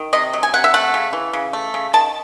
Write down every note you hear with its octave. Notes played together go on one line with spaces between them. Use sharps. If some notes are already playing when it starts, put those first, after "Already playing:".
Already playing: D#3
C3 D#5
F#3
G#5
C3 F#5
E5
A3 F#5
C#3
E3
C#3
A3
C#3
D#3 A5